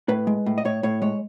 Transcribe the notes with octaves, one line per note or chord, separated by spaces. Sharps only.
A2 B4
G#3
A2
D#5
A2 C#5
A2 C#5
G#3 C#5